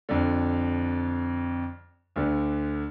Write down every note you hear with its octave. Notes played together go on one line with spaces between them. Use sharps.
F2 D3
D2 D3